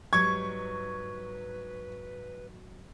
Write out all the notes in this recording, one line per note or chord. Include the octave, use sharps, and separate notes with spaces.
G#2 F#3 G3 B4 C#6 G#6